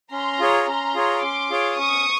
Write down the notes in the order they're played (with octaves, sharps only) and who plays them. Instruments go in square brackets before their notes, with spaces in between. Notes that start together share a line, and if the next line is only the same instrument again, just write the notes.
[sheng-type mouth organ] C#4 [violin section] A#5 C6
[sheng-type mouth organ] F4 G#4 C#5
[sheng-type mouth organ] C#4 [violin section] A#5 C6
[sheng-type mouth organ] F4 G#4 C#5
[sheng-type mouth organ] C#4 [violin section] C6 D6
[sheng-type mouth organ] F4 G#4 C#5
[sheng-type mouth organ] C#4 [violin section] C#6 D#6